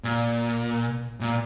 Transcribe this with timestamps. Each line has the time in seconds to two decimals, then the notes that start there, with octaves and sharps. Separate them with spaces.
0.04 A#2
1.21 A#2